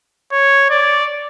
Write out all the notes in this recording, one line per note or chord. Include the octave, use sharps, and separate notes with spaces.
C#5
D5